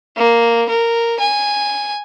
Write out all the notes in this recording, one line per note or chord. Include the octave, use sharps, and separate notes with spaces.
A#3
A#4
G#5